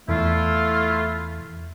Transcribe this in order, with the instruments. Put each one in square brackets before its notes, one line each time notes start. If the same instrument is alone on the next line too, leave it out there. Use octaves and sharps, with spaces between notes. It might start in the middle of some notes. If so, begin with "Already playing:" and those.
[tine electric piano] E2 E3 [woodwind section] A3 E4 F4